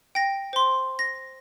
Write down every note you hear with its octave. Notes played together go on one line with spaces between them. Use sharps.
G5 A#6
C5 C6
A#6